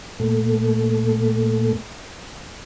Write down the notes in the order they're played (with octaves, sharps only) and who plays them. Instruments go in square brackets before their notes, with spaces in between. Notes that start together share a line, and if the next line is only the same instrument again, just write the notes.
[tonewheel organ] A#2 A3